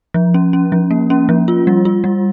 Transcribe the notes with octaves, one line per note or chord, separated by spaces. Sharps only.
F3
C#4
C#4
F3
A#3
C#4
F3
F4
G3
F4
G3